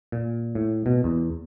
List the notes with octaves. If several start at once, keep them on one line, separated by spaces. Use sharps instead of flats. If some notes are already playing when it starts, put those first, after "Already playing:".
A#2
A2
B2
E2